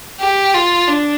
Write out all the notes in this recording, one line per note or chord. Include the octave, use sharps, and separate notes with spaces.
G4
F4
D4